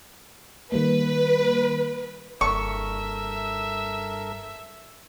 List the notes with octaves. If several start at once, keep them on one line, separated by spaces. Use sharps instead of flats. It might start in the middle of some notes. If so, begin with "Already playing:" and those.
D#3 G3 A#3 B4
F#1 G2 A4 A#4 E5 C#6